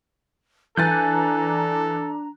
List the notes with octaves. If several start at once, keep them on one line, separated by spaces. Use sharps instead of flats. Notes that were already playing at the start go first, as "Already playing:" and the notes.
E3 D4 A4 G#5 A#5 F#6 G6 A6